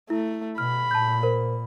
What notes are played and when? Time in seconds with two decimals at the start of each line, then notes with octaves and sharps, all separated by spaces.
0.10 A3 E4
0.58 B2 B5 F6
0.91 A#2 A5 G6
1.23 A#4 C5